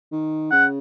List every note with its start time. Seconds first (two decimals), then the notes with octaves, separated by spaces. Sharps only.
0.12 D#3
0.51 C#3 F#5